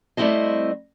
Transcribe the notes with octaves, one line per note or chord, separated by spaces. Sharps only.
G3 A3 C4 E4 C5 D#5